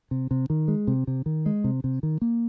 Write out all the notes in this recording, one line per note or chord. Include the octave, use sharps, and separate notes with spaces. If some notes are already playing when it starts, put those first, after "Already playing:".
C3
C3
D#3
G#3
C3
C3
D#3
G#3
C3
C3
D#3
A#3